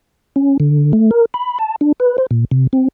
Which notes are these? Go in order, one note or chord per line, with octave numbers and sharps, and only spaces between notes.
C#4
D3
A3
A#4
B5
A5
D4
B4
C5
A#2
C3
C4